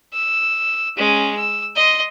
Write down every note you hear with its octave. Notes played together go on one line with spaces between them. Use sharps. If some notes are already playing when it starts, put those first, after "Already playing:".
E6
G#3 C#4
E6
D#5 C6